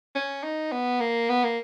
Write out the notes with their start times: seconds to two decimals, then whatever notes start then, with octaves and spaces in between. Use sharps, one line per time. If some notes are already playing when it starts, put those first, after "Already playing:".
0.15 C#4
0.43 D#4
0.72 B3
1.00 A#3
1.29 B3
1.44 A#3